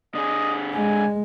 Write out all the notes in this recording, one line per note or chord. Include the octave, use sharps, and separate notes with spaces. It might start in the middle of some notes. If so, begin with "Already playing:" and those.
D3 G#4 D#5
G#3 G#5